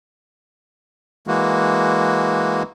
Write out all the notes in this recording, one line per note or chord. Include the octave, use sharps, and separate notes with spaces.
E3 G#3 A#3 F#4